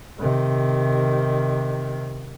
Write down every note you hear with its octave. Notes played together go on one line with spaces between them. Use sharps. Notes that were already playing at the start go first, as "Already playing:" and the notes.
C3 D#3